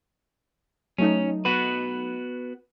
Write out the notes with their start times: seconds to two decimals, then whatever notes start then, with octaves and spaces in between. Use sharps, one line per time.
0.98 F#3 A3 C#4 D#4
1.45 B3 F#4 B4